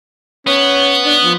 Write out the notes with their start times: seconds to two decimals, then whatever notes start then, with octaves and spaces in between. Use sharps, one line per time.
0.47 B3 C#4
1.05 D4
1.24 F3